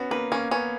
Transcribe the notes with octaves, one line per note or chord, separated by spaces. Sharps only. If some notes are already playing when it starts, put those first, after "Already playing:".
Already playing: B3 C#4 F#4
A#3 B4
A#3 C#4
B3 C#4